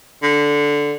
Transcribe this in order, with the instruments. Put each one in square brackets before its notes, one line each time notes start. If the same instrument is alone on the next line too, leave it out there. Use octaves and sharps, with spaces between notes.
[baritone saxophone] D3